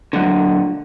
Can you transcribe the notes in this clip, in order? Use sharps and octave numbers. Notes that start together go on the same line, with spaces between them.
A#2 D3 F#3